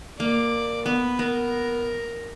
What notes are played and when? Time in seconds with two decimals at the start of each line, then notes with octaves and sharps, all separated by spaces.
0.20 A#3 D5
0.86 B3 B4
1.19 B3 A#4